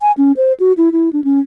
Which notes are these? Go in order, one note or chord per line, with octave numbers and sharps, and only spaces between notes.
G#5
C#4
C5
F#4
E4
E4
D4
C#4